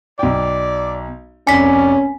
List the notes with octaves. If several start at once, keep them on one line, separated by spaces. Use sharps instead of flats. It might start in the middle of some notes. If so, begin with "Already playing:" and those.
B1 D5 G5
F1 C2 C#4 D5 G#5 B6